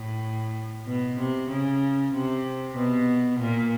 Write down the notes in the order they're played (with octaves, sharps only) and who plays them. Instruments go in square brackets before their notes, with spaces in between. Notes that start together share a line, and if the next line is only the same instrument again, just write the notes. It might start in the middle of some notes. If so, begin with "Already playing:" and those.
Already playing: [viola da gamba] A2
B2
C3
C#3
C3
B2
A#2